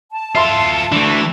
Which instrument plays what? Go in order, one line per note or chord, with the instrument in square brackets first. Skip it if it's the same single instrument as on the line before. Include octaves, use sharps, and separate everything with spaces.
[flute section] A5
[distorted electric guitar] F4 A4 [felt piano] E5 C6
[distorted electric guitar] E3 [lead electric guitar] A3 D4